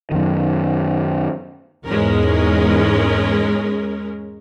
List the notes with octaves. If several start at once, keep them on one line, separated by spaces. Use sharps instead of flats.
F#2 D#3
E2 G#2 G#3 C#4 A#4